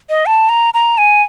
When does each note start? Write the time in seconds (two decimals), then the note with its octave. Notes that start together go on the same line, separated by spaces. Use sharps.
0.09 D#5
0.26 A5
0.49 A#5
0.74 A#5
0.98 G#5